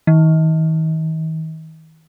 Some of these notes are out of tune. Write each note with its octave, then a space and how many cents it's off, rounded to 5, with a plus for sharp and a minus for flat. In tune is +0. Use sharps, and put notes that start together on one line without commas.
D#3 +40